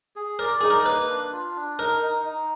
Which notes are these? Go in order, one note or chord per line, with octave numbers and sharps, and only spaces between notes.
G#4
A#4 D5
D#4 G#4
A#4
A#3 B4
D4
F4
D4
D#4 A#4
D#4
D#4